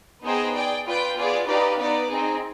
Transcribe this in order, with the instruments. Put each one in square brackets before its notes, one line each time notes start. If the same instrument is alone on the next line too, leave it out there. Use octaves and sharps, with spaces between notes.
[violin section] B3 D#4 G#4 C5 G5
G#4 D5 G5
F4 B4 D5 G5
B3 F4 G#4 D5
D#4 G4 B4 D5 F5
B3 D#4 B4 D5
C4 D#4 G#4